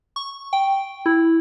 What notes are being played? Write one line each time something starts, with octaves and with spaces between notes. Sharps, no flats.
C#6
G5
E4